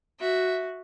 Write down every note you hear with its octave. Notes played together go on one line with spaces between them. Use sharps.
F#4 E5